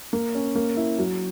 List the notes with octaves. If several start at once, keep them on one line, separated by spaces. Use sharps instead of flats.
A#3
C#4
A#3
E4
F#3